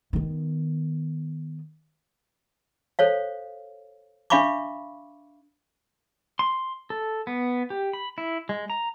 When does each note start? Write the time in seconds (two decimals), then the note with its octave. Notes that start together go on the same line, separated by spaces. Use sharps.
0.13 D#3 B3
2.99 A4 C5 C#5 F5
4.30 D4 E5 F5 B5 C#6 D6
6.39 C6
6.90 A4
7.27 B3
7.70 G4
7.93 B5
8.18 E4
8.49 G#3
8.70 A#5